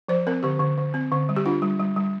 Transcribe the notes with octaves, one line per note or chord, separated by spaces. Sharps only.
F3 C5
C4 A#4
D3 G4
D3
D3
C4
D3
G3
G4
D4 F4
G3
G3
G3